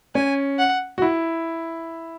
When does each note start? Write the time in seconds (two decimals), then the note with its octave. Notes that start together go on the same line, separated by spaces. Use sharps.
0.15 C#4 G#5
0.59 F#5
0.98 F#4
1.02 E4